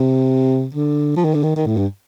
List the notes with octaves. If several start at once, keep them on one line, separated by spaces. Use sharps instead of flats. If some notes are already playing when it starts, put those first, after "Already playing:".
Already playing: C3
D3
F3
D#3
D3
D#3
D#3
A2
G2